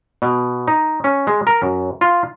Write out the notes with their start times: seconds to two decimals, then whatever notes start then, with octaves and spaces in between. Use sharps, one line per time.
0.22 B2
0.68 D#4
1.04 C#4
1.27 G#3
1.47 A#4
1.62 F#2
2.01 F4